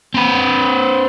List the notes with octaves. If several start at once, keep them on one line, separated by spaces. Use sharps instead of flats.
C4 B4